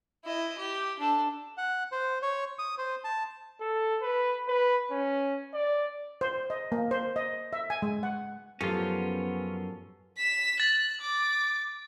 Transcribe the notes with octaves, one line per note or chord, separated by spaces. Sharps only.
E4 D#5
G4
D4 A4
F#5
C5
C#5
D#6
C5
A5
A4
B4
B4
C#4
D5
C5
D#5
A#3
C5
D#5
E5
G#5
G#3
F#5
F#2 F3 B3 C#4 F4 G4 A4
B6 E7
F#6 A6
D6